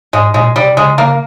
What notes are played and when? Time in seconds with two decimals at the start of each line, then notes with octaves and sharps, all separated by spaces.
0.13 G#2 G#3
0.34 A#2 G#3
0.55 C3 G3
0.77 C#3 G#3
0.98 C#3 A#3